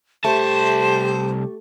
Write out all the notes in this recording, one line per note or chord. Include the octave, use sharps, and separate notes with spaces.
C2 A3 G4 C5 A5